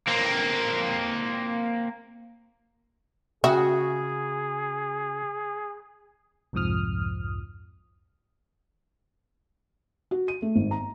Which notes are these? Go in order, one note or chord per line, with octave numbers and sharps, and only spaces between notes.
A#3 C4
C#3 F#4 G#4 E5
C2 F2 G#2 F3 D#6 F6
F#4
D#7
A3
G#1
A#5